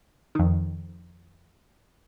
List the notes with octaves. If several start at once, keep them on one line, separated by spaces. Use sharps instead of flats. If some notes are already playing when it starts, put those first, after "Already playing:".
F2 D#3